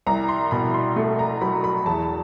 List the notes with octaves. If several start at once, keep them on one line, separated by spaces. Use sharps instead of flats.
C2 A#5
C6
B2 B5
C6
A3
A#5
F#3 B5
B5
E2 A5